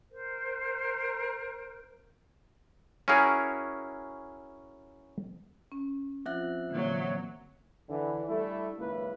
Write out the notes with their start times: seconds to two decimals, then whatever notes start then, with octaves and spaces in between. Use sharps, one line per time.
0.10 A#4 C5
3.08 C#4 E4 F#4 G#4 A#4
5.72 C#4
6.26 F3 C4 F4 E5 F#6
6.70 A#2 D3 E3 F#3
7.89 D3 E3
8.27 G3 A3 D4 E4 A4
8.78 G#1 C#2 F#2 A#3 E4 B4